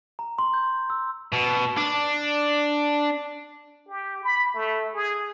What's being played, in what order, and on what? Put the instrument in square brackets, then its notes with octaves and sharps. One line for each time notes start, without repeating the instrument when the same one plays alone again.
[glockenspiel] A#5
C6
G6
E6
[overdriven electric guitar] B2
D4
[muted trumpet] G4
B5
A3
G#4